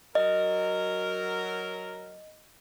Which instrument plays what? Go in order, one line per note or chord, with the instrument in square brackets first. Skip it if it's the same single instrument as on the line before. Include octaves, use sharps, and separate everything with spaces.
[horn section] F#3 A#4 [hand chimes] D#5